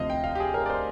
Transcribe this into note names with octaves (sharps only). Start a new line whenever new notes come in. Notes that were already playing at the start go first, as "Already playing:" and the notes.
Already playing: D2 C3 F3 D#5 F5
G5
F5
G4
G#4
A#4
D5
C5